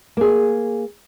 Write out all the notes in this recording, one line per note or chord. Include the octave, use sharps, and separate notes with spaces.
A#3 G#4